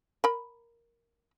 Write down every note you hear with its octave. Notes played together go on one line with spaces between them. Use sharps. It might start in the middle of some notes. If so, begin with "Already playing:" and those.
A#4 B5